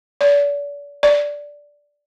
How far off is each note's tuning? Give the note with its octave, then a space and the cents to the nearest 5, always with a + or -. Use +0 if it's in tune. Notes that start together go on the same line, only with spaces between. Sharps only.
D5 -40
D5 -10